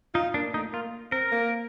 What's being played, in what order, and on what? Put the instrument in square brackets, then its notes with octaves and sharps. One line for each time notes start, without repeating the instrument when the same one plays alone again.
[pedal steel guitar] D#4 [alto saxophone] F4
[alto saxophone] A#3 [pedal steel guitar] D4
[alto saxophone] A3 [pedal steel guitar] D#4
[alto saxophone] A#3 [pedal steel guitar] F4
[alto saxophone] C4 [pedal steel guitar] A#4
[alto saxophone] A#3